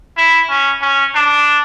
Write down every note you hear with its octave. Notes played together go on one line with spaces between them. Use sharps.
E4
C#4
C#4
D4